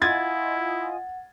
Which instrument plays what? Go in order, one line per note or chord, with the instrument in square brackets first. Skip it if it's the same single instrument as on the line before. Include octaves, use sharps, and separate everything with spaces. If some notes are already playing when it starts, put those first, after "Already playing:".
[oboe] E4 [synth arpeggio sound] F4 D#5 G#5 [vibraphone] F#5 [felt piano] G#6 A6